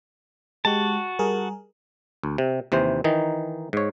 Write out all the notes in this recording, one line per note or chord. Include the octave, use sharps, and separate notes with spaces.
G#3 F#4 G4 A5
G3 G#4 A#4
D2
C3
D#2 C3 E3 C5
D#3 E3 D#4
G#2 C#5